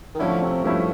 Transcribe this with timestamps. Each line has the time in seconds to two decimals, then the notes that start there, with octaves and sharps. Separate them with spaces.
0.14 D#3
0.19 D3 F3 A3 C#4 E4
0.42 C3
0.64 G2 F3 A3 C#4 E4